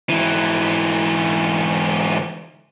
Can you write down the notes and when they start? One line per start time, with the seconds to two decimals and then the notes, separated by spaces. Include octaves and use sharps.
0.09 G#2 E3